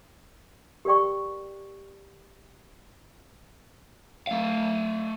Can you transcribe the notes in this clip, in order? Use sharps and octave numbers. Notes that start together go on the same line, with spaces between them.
G4 A#4 D5 G5 C#6
A3 F5